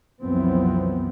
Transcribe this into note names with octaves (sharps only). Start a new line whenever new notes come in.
C2 F#2 E3 F3 B3 C4